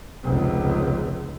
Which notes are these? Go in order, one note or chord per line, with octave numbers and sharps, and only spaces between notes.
F1 C#2